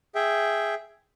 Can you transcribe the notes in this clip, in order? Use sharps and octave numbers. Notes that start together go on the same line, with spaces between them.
G#4 E5 G5